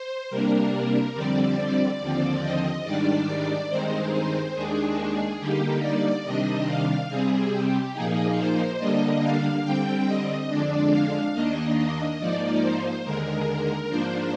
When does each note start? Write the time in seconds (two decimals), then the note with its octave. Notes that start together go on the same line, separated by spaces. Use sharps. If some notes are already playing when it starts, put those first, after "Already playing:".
Already playing: C5
0.30 C3 G3 A#3 D4 A#4
1.14 F2 D3 G3 C4 D5
2.00 D#2 D3 F3 C4
2.42 D#5
2.84 G#2 D#3 G3 D4 D5
3.70 G2 D#3 G#3 C4 D#4 C5
4.12 C5
4.54 D#2 D#3 G#3 D4 G#4
5.39 D3 G3 A#3 D#4 G4
5.82 D5
6.24 C3 D#3 G3 D4 D#5
6.67 F5
7.09 C3 G3 C4 G#4
7.51 G4
7.94 A#2 F3 A#3 D#4 G#4
8.37 C5
8.79 D3 G3 A#3 D4 D#5
9.22 F5
9.64 D3 G3 C4 G5
10.07 D#5
10.49 F2 D3 G#3 D4 D5
10.92 F5
11.34 D#2 D#3 A#3 D4 D#5
12.19 G#2 F3 A#3 D#4 D5
12.62 C5
13.04 D#2 D3 G#3 A#4
13.89 G#2 F3 A#3 D4 C5